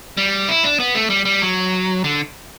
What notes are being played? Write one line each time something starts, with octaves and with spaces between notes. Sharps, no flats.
G3
E4
D4
B3
A3
G3
G3
F#3
D3